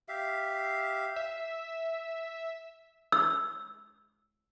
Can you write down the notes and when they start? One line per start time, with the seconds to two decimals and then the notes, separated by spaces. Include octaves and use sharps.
0.08 G4 E5 F5
1.16 E5
3.12 E6